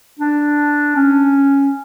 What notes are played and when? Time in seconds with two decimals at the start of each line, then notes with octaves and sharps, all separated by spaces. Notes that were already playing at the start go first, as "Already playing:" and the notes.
0.19 D4
0.96 C#4